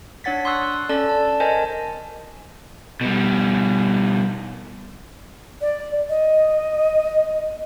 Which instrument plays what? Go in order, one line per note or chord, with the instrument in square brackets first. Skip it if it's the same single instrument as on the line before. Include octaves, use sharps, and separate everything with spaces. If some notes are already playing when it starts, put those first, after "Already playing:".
[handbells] D4 C#5 F#5 A6 B6
C6 C#6 D#6 E6 F#6
C#4 A4 D5 A5 A6
A5
A#4 C5 D#5 G#5 A5
[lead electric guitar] B2 G3
[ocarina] D5
D#5